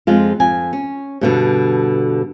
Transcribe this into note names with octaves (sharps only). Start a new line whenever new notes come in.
F2 G#3 F4
F2 G#5
C#4
G2 B2 D3